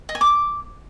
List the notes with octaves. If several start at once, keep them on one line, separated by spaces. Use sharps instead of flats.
D#5
G#5
D6